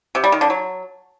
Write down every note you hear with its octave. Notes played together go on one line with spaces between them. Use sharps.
C3
G3
D#3
D3
F#3